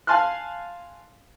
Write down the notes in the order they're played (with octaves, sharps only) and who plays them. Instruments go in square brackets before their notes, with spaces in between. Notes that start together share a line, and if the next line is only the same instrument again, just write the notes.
[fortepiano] F5 G#5 A5 C6 F6 F#6